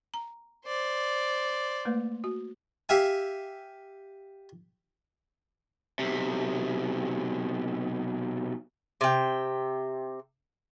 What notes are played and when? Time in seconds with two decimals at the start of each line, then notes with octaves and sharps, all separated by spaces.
0.14 A#5
0.66 C5 D5
1.85 A3 A#3 B4
2.24 F#4
2.89 G4 E5 F5 G#5
5.99 B1 C3
9.01 C3 G5